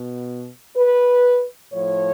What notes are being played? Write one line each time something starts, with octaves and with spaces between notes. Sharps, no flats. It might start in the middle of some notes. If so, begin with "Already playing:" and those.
Already playing: B2
B4
A2 F3 C#5